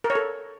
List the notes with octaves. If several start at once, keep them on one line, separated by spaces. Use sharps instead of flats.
A#4
C#5
A4